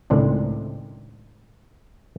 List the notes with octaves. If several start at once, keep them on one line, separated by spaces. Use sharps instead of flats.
C#2 A2 D#3 C4 D4